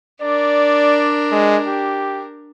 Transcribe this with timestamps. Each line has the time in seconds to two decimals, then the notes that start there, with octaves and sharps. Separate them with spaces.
0.22 D4 A#4 D5
1.32 G#3
1.67 G4